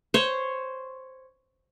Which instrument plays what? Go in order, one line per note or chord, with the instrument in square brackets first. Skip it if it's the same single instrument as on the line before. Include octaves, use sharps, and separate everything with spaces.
[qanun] C5 C#5